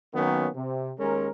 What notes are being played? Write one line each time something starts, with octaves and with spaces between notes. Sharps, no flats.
D#3 F#3 A#3 B3 C#4
C3
D#2 G#3 C#4 A#4